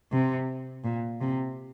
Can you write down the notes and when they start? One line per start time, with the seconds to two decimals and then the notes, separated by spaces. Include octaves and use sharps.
0.12 C3
0.84 A#2
1.21 C3